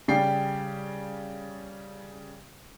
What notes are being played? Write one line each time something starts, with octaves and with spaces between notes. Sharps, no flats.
C#3 G3 D5 G5 C7